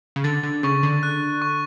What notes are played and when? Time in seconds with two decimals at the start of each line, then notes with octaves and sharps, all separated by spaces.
0.16 C#3
0.24 D3 A6
0.43 D3
0.63 C#3 C#6
0.83 D3
1.03 F#6
1.42 C#6